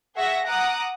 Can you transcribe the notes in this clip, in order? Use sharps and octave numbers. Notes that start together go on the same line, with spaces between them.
G#4 E5 F#5 C#6 A#6
F#5 A#5 D6 D#6 F#6